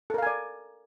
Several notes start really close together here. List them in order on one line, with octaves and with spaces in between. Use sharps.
A4 A#4 F5 G#5 D5